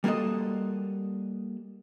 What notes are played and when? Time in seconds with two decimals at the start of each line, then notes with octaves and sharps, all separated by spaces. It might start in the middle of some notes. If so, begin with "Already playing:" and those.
0.04 G3 A#3 F#4 A4 D#5